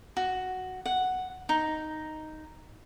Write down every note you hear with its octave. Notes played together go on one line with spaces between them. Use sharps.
F#4
F#5
D#4